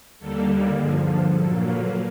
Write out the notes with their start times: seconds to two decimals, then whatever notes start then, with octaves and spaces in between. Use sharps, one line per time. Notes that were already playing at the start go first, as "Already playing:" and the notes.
0.19 D#2 D3 G3 A#3 A4
0.77 G2 D3 F3 G#4
1.06 A4
1.35 A#2 F#3 A#3 A4
1.64 B4